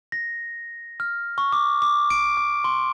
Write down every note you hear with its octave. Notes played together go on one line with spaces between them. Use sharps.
A#6
F6
C#6
D6
D6
D7
D6
C6